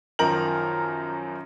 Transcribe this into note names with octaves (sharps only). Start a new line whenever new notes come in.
F#2 D#3 F3 A#4 A#5 F#7